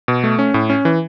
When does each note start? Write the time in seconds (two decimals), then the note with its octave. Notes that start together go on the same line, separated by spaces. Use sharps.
0.08 B2
0.24 A3
0.39 C#4
0.54 A2
0.70 C#4
0.85 E3